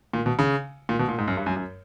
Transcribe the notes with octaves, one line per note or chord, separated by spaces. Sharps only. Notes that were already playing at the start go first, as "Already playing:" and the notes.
A#2
B2
C#3
A#2
B2
A#2
G#2
F#2
G2
F#2
F#2